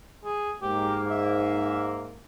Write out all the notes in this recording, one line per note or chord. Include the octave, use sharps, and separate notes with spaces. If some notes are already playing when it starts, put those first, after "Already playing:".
G#4
G#2 A#3 G4
E5